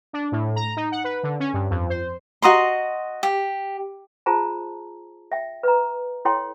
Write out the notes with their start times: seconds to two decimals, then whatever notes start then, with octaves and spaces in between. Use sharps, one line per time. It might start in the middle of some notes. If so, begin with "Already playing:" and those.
0.13 D4
0.32 A2
0.56 A#5
0.77 D#4
0.92 F#5
1.04 B4
1.23 D3
1.40 C#4
1.54 G2
1.70 F2
1.90 C5
2.42 F#4 D#5 A#5 C6
3.23 G4
4.26 F4 G#4 C5 A5 A#5
5.32 E5 G5
5.63 B4 A#5
6.25 E4 A4 C#5 G5 C6